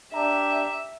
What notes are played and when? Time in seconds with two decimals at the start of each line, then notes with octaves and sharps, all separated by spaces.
0.14 D4 G4 E5 A#5